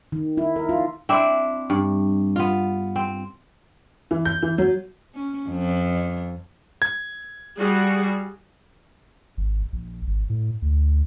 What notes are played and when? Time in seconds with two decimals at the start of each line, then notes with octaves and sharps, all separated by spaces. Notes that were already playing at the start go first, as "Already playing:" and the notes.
0.12 D#3
0.37 E4
0.56 A#4
0.69 F4
1.09 C4 D4 E4 E5
1.70 G2
2.36 B3 F4
2.96 C4
4.11 E3
4.25 G6
4.42 E3
4.58 F#3
5.15 C#4
5.50 F2
6.82 G#6
7.58 G3 F#4 G#4
9.37 G#1
9.73 A#1
10.07 G#1
10.30 A2
10.62 D2